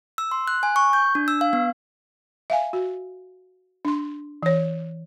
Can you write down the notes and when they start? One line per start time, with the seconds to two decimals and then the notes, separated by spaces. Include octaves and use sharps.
0.18 E6
0.31 C6
0.48 F#6
0.63 G#5
0.76 C#6
0.93 G6
1.15 D4
1.28 E6
1.41 F5
1.53 B3
2.50 E5 F5 G#5
2.73 F#4
3.85 D4 C6
4.43 E3 C#5